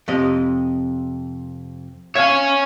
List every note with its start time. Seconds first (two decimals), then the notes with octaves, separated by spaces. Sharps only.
0.08 F2 C3 D#5
2.15 C#5 E5 F5 G#5